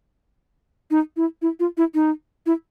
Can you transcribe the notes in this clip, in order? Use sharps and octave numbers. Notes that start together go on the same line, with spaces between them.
D#4
E4
E4
F4
E4
D#4
E4